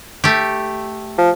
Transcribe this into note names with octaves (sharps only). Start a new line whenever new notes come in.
A3 G4
F3